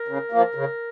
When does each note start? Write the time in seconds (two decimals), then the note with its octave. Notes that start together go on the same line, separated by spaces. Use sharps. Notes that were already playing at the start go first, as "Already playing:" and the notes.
Already playing: A#4
0.08 C#3
0.32 F3 A#3
0.55 C#3